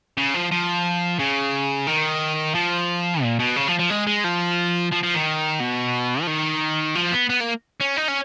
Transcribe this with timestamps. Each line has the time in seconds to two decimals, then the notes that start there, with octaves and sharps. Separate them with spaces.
0.17 C#3
0.34 F3
0.51 F3
1.19 C#3
1.87 D#3
2.55 F3
3.22 A#2
3.39 B2
3.56 C#3
3.68 F3
3.79 F3
3.90 G#3
4.07 G#3
4.24 F3
4.92 F3
5.03 F3
5.14 D#3
5.60 B2
6.22 F3
6.27 D#3
6.95 F3
7.12 B3
7.29 B3
7.41 A#3
7.80 C#4
7.97 D#4
8.08 C#4